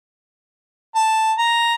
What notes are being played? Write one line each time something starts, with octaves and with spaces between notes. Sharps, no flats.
A5
A#5